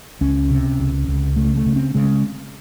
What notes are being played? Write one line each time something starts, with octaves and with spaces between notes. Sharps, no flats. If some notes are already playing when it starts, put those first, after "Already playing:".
C#2 C#4
C3
C#2
C#2
C#3 A3
A3
C#3
C4
C#3 G#3